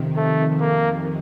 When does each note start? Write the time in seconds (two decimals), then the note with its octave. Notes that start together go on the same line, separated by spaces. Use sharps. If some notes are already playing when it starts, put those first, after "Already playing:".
Already playing: F2 C3 D#3
0.17 A3
0.60 A#3